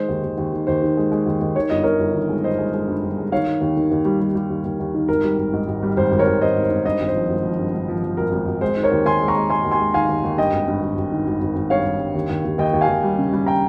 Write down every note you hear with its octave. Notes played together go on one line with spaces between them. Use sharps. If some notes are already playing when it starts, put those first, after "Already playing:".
Already playing: D#3 G#3 C5
D#2
D#2
D#2
D#3
D#2 C5
D#3
G#3
G#3
D#2
D#2
D#3 C#5
G1 D#5
G1 A#4 C#5
G1
D#3
G#3
G2 C5 D#5
G#3
G#3
G2
G1
G#3
D#3 C#5 F5
D#3
D#2
D#3
D#2
G3
G3
G3
D#2
D#2
D#2
D#3
G#1 A#4
G3
G#1
G#2
G#1
G3
G#1 C5
G#1
A#4 C#5
G#1
G#1 C5 D#5
G#2
C5
G#2
G2 C5 D#5
G#1
C5
F3
G#1
F3
G2
G2
F3
F3
G#1 A#4
G#1
G#1
G#3 C5
D#3
A#4 C#5
D#2
D#2 G#5 C6
G#3
A#5 C#6
G#3
G#3 G#5 C6
D#2
G#5 C6
G#3
D#3 F5 G#5
D#2
D#2
G2 D#5 G5
G#1
G2
G#1
G#1
D#3
G#1
G#1
G#1
G2 C#5 F5
G2
G2
D#2
D#2
D#2
D#2 D#5 G5
D#2
F5 G#5
D#2
G3
C#3
G3
G5 A#5